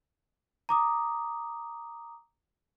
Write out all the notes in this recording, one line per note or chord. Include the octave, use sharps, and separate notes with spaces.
A#5 D6 D#6